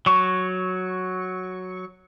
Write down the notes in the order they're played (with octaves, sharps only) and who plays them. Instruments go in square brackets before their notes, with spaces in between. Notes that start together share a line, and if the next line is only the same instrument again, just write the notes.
[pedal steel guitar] F#3 C#6